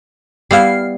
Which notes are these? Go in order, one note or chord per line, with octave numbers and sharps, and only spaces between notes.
G3 B3 E4 F5 C7